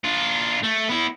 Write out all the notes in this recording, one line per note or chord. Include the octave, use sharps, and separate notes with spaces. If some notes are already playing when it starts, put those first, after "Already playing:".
D4 F4
A3
B3 E4